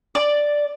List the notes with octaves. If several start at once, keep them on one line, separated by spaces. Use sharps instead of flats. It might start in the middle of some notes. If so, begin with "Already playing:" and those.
D5